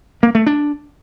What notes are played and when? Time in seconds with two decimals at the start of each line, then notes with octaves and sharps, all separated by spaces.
0.23 A#3
0.35 A3
0.47 D4